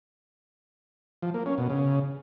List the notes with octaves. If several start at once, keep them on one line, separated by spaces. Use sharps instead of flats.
F3
A#3
C#4
B2
C#3